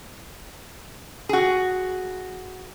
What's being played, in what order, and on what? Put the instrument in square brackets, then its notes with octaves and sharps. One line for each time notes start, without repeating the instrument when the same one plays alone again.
[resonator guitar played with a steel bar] F#4 G#4